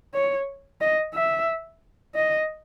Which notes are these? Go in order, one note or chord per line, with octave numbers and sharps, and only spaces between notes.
C#5
D#5
E5
D#5